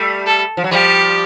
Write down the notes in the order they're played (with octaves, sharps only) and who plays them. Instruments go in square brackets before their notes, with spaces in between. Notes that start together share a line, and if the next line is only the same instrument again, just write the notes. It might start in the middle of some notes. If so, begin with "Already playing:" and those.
Already playing: [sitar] G3 A3
[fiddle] A4
[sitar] F3
F#3
[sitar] F3 G3 [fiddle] G4